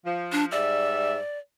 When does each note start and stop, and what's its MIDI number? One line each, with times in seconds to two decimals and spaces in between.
0.04 0.51 53
0.32 0.45 62
0.51 1.14 44
0.51 1.14 55
0.51 1.38 74
0.51 1.14 76